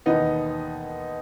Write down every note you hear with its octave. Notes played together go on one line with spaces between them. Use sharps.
E1 D#2 D#3 B3 D#4